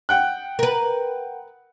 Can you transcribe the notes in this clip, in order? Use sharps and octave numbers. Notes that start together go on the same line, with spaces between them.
F#5 G5 F#6
A#4 B4